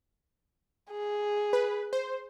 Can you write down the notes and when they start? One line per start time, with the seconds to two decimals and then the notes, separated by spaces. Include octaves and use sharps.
0.91 G#4
1.53 B4
1.93 C5